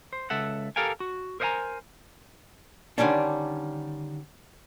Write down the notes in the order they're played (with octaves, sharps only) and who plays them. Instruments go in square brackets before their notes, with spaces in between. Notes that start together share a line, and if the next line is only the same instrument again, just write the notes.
[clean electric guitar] C5
C#2 A4 E5 F#5
G4 A4 A#4 F5 G5 G#5
F#4
A#4 C5 D#5 F#5 G#5 A#5
[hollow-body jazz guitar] D3 D#3 G3 C#4 D4